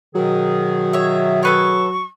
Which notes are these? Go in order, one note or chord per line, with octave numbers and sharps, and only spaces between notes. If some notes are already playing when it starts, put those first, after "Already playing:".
B2 D#3 F#3 G#4
C#5 E5
A4 B4 C#5 C#6